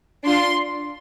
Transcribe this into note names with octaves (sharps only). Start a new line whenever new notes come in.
D4 F4 C6